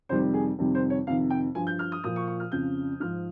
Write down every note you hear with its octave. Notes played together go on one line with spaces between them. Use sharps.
F2 C3 D#3 G3 C5
G#4
F2 C3 D#3 G3
C5
C#5
F2 C3 D#3 F5
G5
G2 F3 G#5
G6
F6
D#6
A#2 F3 D#6
C#6
C#6
F6
F2 C#3 F3 G6
G#2 F3 F6